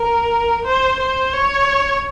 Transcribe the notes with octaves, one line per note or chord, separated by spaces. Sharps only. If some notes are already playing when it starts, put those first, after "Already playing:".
Already playing: A#4
C5
C5
C#5